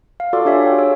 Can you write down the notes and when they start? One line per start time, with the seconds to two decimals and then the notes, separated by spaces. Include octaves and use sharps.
0.20 F5
0.33 F4 F#4 A4 D5 C6 D6
0.45 D4 G4 C#5 E5 G#5
0.63 F5 G5
0.78 G#4 C#5 E6